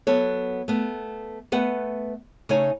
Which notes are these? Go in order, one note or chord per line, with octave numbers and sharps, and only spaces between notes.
F#3 B3 A4 C#5
A3 B3
A3 B3 B4 F#5
C#3 A3 D#4 C#5 G#5